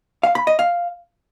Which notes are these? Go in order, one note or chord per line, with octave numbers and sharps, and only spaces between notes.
F5
B5
D#5
F5